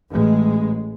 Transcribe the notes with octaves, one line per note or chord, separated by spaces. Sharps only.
A1 G#3